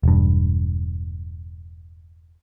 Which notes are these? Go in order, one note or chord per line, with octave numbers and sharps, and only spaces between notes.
E1 G2